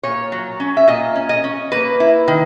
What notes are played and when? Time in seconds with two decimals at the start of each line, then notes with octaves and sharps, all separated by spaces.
0.03 A#2 C#5
0.32 F#3
0.60 C#4
0.77 E5
0.88 A#2 D#5
1.15 C#4
1.29 D#5
1.44 C#4
1.72 A#3 B4
2.00 E4
2.28 D#3